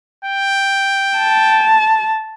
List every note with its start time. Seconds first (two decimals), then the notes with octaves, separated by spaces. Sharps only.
0.25 G5
1.18 A5